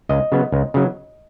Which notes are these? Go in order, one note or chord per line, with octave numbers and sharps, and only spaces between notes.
C#2 D#5
C#3 F#3 B3
C#2
C#3 F#3